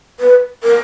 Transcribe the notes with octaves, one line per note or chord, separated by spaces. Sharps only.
B4
A#4